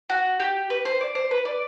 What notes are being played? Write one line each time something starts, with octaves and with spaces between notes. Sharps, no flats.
F#4
G4
B4
C5
D5
C5
B4
D5